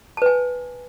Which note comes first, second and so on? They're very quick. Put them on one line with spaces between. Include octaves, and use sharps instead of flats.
A5 B4 G#5